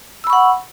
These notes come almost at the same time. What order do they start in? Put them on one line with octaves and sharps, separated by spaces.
E6 B5 C#6 F#5